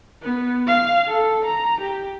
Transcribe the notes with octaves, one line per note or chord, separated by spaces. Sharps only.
B3
F5
A4
A#5
G4